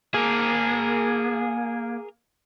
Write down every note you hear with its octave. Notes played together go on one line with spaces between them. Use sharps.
A#3 G#4 A#4